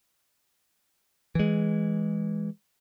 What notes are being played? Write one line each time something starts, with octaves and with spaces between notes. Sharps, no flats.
E3 G#3